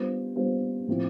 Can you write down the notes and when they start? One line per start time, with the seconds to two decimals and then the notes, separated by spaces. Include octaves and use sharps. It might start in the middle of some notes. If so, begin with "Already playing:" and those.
Already playing: G3 B3 D4 F4 C5
0.36 G3 B3 D4 F4 C5
0.87 A2 F3 A3 C4 F4